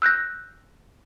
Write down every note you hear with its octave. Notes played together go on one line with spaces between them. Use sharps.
E6 F#6 G6 A#6